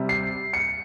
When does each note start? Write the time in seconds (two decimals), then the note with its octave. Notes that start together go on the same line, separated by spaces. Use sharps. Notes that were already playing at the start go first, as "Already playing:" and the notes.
Already playing: C3 G3
0.09 C7
0.53 C#7